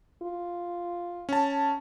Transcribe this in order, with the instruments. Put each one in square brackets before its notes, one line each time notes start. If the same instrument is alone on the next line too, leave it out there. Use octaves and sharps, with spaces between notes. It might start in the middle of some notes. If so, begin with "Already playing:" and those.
[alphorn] F4
[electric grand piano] C#4 A5